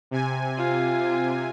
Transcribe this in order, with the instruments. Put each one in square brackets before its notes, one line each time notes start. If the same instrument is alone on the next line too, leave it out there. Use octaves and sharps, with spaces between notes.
[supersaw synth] C3 G#5
[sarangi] F4